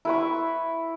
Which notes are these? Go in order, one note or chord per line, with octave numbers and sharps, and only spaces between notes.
E4 B4 C#6